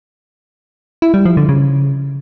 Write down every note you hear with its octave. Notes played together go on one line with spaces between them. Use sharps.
E4
G3
F3
D3
C#3